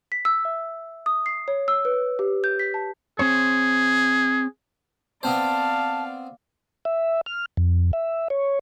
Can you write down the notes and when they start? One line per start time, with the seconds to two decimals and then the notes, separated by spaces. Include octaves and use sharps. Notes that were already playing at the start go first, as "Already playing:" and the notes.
0.12 B6
0.25 E6
0.45 E5
1.06 D#6
1.26 C7
1.48 C#5
1.68 E6
1.85 B4
2.19 G4
2.44 G6
2.59 B6
2.74 A5
3.19 C4 G#4 C5 C#5
5.23 B3 C4 C5 D5 F5 A5
6.85 E5
7.26 F6
7.57 F2
7.93 E5
8.30 C#5